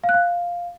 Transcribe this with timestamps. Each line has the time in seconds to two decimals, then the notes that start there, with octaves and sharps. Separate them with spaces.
0.04 F5
0.09 F#6
0.14 F5